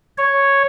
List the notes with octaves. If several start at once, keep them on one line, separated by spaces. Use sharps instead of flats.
C#5